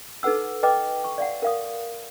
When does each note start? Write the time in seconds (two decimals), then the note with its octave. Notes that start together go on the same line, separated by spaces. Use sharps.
0.23 D#4 A4 B4 F#5 E6
0.63 B4 D#5 G5 D6
1.04 C#6
1.18 D5 F5 F#5
1.42 A#4 F5 D#6